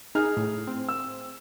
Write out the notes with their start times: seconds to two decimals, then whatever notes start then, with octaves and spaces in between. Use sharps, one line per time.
0.15 D#4 G#4 F6
0.37 A2
0.67 C4
0.89 E6